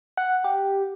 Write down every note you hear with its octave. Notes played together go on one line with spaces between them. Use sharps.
F#5
G4